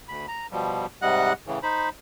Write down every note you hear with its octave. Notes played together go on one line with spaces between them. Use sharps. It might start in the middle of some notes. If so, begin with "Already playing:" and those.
D2 B5
A#5
B2 F3 G3
G#2 C3 G3 D#5 F#5 F#6
A2 C#3 E3
D#4 C5 B5